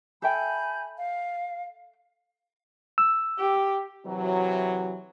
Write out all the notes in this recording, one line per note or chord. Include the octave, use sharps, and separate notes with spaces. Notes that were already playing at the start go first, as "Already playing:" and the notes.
A4 E5 G5 G#5 B5 G6
F5
E6
G4
C3 E3 F#3